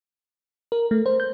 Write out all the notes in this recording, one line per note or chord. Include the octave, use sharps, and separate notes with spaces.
A#4
A3
C5
G6